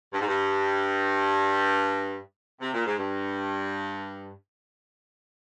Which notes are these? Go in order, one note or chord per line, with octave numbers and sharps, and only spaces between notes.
G2
G#2
G2
C3
A#2
G#2
G2